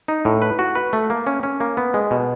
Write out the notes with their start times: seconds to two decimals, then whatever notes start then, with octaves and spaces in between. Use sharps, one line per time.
0.08 D#4
0.25 A2
0.42 B4
0.59 F#4
0.75 B4
0.93 A3
1.10 A#3
1.27 C#4
1.43 C#4
1.60 A#3
1.77 B3
1.94 G#3
2.11 B2